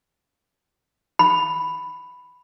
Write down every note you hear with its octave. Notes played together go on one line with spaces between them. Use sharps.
B5